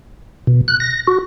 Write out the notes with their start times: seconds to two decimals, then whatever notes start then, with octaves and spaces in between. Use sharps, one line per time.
0.47 B2
0.68 F#6
0.80 A#6
1.07 F#4